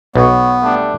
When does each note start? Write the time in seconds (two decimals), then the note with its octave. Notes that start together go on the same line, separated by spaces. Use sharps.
0.16 B1 B3 B4 C#5 C#6
0.62 G3 A3 D4